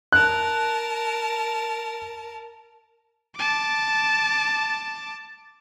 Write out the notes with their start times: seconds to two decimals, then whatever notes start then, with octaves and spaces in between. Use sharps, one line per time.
0.12 A#4 A5 F#6
3.36 A5 D6